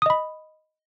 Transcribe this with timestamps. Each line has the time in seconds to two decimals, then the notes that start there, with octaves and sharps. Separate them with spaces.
0.02 D#6
0.06 D#5
0.10 B5